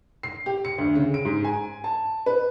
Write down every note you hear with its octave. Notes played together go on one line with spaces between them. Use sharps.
C7
G4
C#7
D2
C#3
D7
G#2
G#5
A5
B4